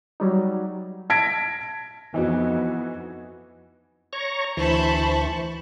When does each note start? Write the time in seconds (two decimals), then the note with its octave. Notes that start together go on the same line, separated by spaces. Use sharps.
0.20 F#3 G3 D#4
1.10 A5 G#6 A#6 B6 D7
2.14 F2 E3 B3 D#4 F#4
4.13 C#5 A#5 C#6
4.57 D2 E3 C5 A5 B5 C#6